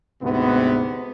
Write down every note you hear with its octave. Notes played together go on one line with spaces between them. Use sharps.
D2 G#2 C3 B3